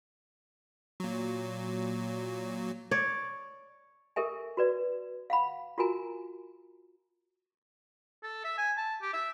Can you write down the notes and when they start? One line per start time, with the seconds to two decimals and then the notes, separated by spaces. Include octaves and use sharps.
1.00 A#2 F#3
2.91 C#5 D5
4.16 G4 A4 A#4 E5 G#5
4.57 F#4 B4 D5
5.30 F5 F#5 B5
5.78 F4 F#4 A#4 G#5 A#5
8.23 A4
8.44 E5
8.58 G#5
8.77 A5
9.02 G4
9.13 E5